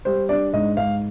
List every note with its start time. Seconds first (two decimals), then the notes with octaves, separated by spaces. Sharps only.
0.05 G3 C5
0.29 D4 D5
0.53 G#2 D#5
0.77 G#2 F5